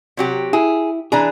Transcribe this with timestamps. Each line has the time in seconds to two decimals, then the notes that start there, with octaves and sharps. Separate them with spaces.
0.17 C3 F#3 G4
0.53 E4 G#4
1.12 E3 D4 G#4 A#5